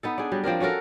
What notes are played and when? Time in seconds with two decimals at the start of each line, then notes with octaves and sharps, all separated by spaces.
0.03 B3 D#4 A4
0.18 D4 G#4
0.32 F#3 G3
0.44 F3 C4 D4 A#4
0.60 C#4 F#4 A4 A#4